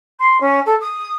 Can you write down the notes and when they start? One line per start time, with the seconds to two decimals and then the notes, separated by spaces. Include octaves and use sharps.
0.19 C6
0.40 C#4
0.66 A4
0.80 D#6